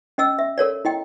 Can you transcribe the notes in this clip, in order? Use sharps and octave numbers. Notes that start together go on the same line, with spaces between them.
C#4 D#5 E6
E5
A4 A#4 C#5 D5
E4 D#5 G5